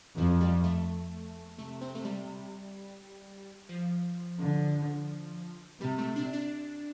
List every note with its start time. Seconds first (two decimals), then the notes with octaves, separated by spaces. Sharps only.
0.17 F2 F3
0.41 G3
0.64 A3
1.58 C3 A3
1.81 C4
1.95 A3
2.05 G3
3.69 F3
4.40 D3
5.80 C3 G3
5.98 A3
6.16 D4
6.33 D4